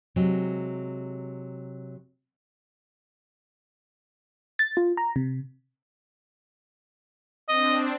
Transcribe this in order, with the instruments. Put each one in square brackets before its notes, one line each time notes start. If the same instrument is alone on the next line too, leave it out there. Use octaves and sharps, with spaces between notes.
[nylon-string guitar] C3 F#3 G#3
[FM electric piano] A6
F4
A#5
C3
[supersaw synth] C4 D4 [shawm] D#5